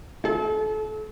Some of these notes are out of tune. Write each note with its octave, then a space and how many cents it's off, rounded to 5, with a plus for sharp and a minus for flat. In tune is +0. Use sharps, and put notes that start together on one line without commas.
A4 -35